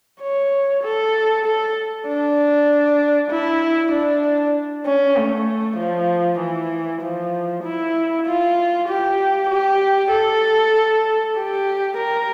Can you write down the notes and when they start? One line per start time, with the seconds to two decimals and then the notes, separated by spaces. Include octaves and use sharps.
0.21 C#5
0.83 A4
1.45 A4
2.07 D4
3.30 E4
3.92 D4
4.86 C#4
5.16 A3
5.78 F3
6.40 E3
7.01 F3
7.64 E4
8.26 F4
8.88 G4
9.50 G4
10.11 A4
11.36 G4
11.97 A#4